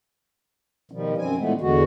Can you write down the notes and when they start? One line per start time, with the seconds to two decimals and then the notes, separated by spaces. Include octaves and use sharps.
0.91 B2 D#3 F3 G3
1.18 F#2 C4 G#5
1.38 A#2 E3 G#3 A3 B3
1.61 E2 D3 G#3 B3 F#4